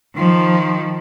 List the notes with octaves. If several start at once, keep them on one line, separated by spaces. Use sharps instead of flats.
D#3 F3